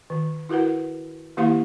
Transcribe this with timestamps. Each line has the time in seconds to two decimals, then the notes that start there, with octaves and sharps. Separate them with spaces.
0.10 D#3
0.49 E4 F#4 A#4 B4 F#5
1.37 D#3 A#3 E4 G4 F5 C6